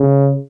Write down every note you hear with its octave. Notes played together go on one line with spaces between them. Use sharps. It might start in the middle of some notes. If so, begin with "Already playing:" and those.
Already playing: C#3